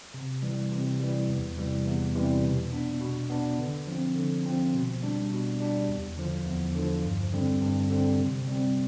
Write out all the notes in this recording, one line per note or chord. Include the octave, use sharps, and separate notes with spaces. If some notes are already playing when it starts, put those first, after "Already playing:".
C3
E3 G3
C3
E3 G3
E2
C3 E3 G3
E2
C3 E3 G3
B2
B3 D4
B2
B3 D4
D3
F3 C4
D3
F3 C4
B2
G3 D4
B2
G3 D4
E2
D3 F3
E2
D3 F3
G2
D3 G3 C4
G2
D3 G3 C4
C3
G3 C4